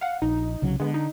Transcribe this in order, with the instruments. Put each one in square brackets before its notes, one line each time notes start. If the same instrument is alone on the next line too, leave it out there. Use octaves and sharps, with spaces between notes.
[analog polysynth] F5 F#5
[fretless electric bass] A#1 [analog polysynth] D#4
[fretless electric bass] C2 C#3 F#3
[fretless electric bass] D3 [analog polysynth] G#3 B3
[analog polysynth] D#4